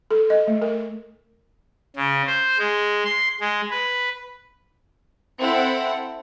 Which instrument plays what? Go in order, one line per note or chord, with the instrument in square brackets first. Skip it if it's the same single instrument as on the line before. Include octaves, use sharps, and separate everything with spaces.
[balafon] A4
D#5
A3
A#4
[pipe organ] C#3
C5
G#3
C6
G#3
B4
[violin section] C4 E4 A4 F#5